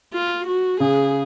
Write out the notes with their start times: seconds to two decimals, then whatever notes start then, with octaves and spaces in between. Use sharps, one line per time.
0.14 F4
0.47 F#4
0.80 C#3 G#4